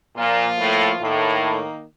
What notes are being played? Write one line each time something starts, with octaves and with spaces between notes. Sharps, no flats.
A#2 F3 A#3 F4
A2
A2 D#3 A#3 D#4